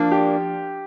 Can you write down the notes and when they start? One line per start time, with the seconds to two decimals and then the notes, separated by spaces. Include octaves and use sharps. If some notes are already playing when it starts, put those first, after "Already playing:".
Already playing: F3 A#3 D4
0.12 G4